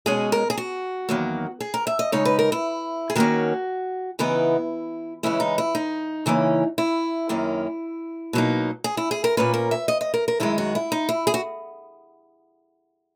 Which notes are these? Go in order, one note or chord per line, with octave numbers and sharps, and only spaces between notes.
B2 G#3 C#4 G#4
A#4
G#4
F#4
E2 D#3 F#3 A#3
G#4
A#4
E5
D#5
C#3 G#3 D#4 C#5
B4
A#4
E4
G#4
D#3 A#3 C#4 F#4
C#3 E3 B3 D#4 E4
C#3 E3 G#3 C#4 E4
D#4
E4
D#4
C#3 E3 A#3 C#4
E4
F#2 D#3 A#3 C#4
B2 F#3 A#3 D#4
G#4
E4
G#4
A#4
A#2 A#3 C#4 B4
A#4
E5
D#5
D#5
A#4
A#4
F#2 D#3 G#3 E4
F#4
E4
D#4
E4
G#4
F#4